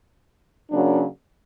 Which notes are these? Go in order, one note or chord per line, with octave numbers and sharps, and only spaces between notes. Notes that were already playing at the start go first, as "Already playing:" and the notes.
F#2 C#3 F#3 A#3 D4